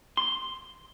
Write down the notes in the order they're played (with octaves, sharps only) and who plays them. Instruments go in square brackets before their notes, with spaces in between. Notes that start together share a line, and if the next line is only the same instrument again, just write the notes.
[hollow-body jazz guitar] C6